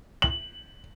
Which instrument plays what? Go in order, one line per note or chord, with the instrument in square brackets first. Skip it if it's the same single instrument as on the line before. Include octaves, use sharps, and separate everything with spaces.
[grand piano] F#7